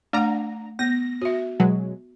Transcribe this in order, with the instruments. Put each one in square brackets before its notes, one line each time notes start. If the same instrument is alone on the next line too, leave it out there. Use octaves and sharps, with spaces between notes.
[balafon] A3 F#5 [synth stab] D4 A#5
[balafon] B3 [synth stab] A#6
[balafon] F#4 E5
[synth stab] B2 F#3 G#3